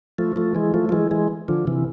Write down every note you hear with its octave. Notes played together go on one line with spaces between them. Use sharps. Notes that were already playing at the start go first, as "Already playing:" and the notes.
F3 A3
F3 A3
E3 G#3
F3 A3
F3
E3 G#3
E3 G#3
D3 F3
C3 E3